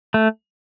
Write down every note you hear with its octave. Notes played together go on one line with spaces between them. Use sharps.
A3